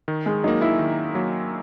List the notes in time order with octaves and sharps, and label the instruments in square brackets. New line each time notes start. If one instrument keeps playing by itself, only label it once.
[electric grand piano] D#3
[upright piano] G#3
[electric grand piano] F#3 A#3 [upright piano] D#4
[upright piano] E4
[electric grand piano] D#3
F#3 A#3